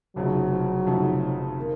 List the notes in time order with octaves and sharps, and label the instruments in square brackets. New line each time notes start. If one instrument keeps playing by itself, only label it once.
[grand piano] F1 F2 C#3 A3 D#4 [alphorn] F#3
[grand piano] F1 F2 C#3 A3 D#4
D#3 A#3